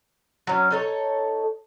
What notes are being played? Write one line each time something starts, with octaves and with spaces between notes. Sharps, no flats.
F#3 C#4
D#4 A4 C#5